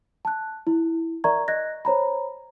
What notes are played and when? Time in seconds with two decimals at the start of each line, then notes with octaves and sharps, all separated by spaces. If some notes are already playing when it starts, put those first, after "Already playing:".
0.25 A5 F#6
0.67 E4
1.24 A#4 D5 E5 A#5 C#6 G#6
1.48 D#5 F#6 G#6 A#6
1.85 C5 C#5 A#5 B5